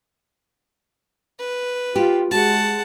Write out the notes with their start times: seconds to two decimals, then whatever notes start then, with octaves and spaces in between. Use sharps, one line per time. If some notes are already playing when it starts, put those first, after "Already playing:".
1.40 B4
1.96 F4 G4
2.31 G#3 F#4 F#5 A5